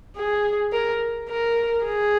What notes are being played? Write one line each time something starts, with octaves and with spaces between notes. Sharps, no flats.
G#4
A#4
A#4
G#4